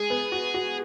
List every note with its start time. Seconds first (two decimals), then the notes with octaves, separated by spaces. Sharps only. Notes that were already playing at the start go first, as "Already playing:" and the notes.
Already playing: G#3 G#4
0.10 B3
0.32 F#4
0.54 F#4